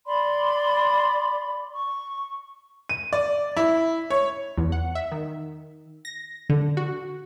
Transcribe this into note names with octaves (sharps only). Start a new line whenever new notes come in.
D5 B5 C6 D6
C#6
D#7
D5
E4
C#5
E2
F#5
E5
D#3
A#6
D3
F#4